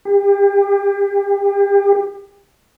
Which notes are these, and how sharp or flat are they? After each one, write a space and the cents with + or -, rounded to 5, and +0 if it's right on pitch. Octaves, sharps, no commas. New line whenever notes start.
G4 +35